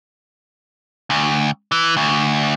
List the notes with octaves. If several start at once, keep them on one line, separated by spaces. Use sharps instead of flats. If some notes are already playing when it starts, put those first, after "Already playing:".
D2
E3
D2